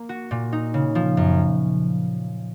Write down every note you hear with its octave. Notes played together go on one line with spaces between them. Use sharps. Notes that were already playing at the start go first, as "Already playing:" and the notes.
Already playing: A#3
F#4
A#2
D#4
C#3
F3
F#2